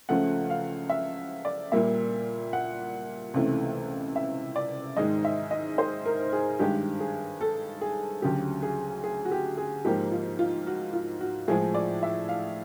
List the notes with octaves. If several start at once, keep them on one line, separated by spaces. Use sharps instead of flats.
C#2 C#3 F3 A3 F#5
F5
E5
D5
A#2 G3 A#3 E5
F#5
C#2 C3 E3 A3
E5
D5
G#2 D#3 G#3 D#5
E5
D#5
C5
A#4
G#4
G2 D#3 G#3 G4
G#4
A4
G#4
D2 C#3 F#3 G4
G#4
G#4
F#4
G4
G#4
G#2 F3 A#3 G4
F4
F4
F#4
F4
F#4
A2 F3 G#3 G#4
D5
E5
F5